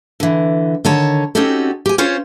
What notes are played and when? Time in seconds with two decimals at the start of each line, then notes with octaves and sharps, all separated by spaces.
0.20 D3 E3
0.85 D3 D#3 C#5 A5
1.35 C4 C#4 D#4 F#4 G4 A4
1.86 G4 G#5
1.98 C#4 F4 C5 C#5